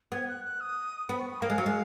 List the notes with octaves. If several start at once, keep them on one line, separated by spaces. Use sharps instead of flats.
B3 G#6
F#6
F#6
D#6
B3 B5
C#6
D#6
A#3 F5
G#3
F#3
G#3